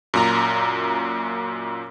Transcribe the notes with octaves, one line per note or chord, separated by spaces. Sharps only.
F#2 A#2 A#5